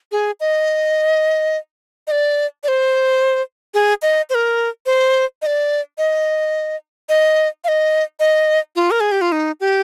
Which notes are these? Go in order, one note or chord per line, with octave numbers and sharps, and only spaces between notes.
G#4
D#5
D#5
D5
D5
C5
G#4
D#5
C5
A#4
C5
D#5
D5
D#5
D#5
F5
D#5
D#5
F4
A#4
G#4
G4
F4
D#4
G4